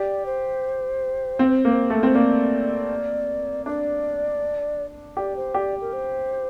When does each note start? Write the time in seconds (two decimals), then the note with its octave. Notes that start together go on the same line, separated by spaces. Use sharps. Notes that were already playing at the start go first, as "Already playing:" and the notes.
Already playing: G4 D5
0.26 C5
1.39 C4
1.65 A#3
1.90 A3 A4
2.00 A#4
2.03 C4 C5
2.15 A#3 D5
3.66 D4 D5
5.17 G4 D5
5.36 C5
5.54 G4 D5
5.81 A#4
5.93 C5